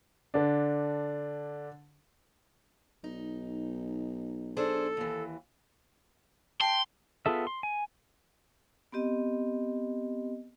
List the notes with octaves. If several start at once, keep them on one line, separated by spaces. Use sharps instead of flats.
D3 D4
B1 D#4
D4 G#4 A4 C5
D#2 E3
G5 A5 C6
B3 F4 G#4 A4 E5
C6
G#5
B3 C4 G4 D#5